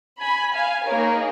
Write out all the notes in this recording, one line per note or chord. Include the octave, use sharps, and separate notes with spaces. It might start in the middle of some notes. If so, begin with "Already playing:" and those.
G#5 B5
F5 G#5
A#3 D#4 G#4 A#4 C#5